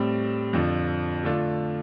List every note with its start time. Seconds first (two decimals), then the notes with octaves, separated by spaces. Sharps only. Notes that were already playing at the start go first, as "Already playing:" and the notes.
Already playing: A2 G3 C4
0.53 F2 D3 F3
1.23 D3 A3 D4 F4